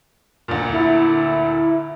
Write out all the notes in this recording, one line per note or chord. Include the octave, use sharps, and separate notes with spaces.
D2 A#2
E4